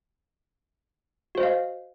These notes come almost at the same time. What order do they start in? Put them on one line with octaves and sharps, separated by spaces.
F#4 C5 D#5 F5